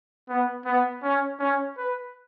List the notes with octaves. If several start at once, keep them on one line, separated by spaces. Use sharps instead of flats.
B3
B3
C#4
C#4
B4